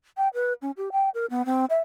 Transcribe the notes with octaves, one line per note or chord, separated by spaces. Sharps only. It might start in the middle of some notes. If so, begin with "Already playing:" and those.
G5
B4
C#4
G4
G5
A#4
B3
C4
E5